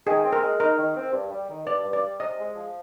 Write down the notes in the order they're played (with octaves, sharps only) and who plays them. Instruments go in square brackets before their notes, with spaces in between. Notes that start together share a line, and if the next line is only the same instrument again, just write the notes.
[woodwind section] D#3 [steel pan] G#4
[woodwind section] C4
[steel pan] A#4
[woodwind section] G#3
[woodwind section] D#4 [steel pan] A#4
[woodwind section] D#3
C4
G2
G3
D#3
[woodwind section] G2 [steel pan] D5
[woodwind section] G2
[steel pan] D5
[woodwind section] G3
[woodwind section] C3 [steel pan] D#5
[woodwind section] G#3
F3